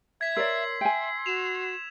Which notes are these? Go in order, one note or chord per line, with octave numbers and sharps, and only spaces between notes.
E5 G#6 B6
A#4 C#5 D5 C6 E6
E5 G5 G#5
F#4 E7 F7